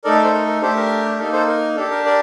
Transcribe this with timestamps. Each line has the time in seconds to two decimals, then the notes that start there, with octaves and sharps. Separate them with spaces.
0.04 A3 D#4 A4 A#4 D5
0.24 C5
0.34 A#4
0.47 A#4
0.62 A3 D4 G4 A4 C5
0.76 A#4
1.19 A#3 D#4 A4 A#4
1.33 A4 C5
1.48 A#4
1.77 D4 G4 A4
1.91 A#4
2.06 A#4 D5